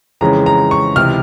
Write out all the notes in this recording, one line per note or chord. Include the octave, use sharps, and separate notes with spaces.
F2 C#3 E3 G#3 A#5
A#5
C#6
C#2 C3 E3 F6